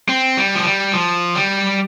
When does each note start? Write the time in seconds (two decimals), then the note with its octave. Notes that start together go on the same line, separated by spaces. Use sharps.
0.09 C4
0.37 G3
0.55 F3
0.65 G3
0.93 F3
1.35 G3